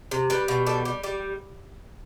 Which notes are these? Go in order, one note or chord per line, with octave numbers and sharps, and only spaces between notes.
C3
G3 B4
B2
G3 A4
G3
G3 G4